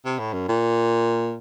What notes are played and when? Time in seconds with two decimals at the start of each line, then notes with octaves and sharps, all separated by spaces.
0.05 C3
0.19 A2
0.33 F#2
0.49 A#2